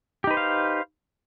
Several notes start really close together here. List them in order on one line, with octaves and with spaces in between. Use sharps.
G4 D#4 B4 C5 F5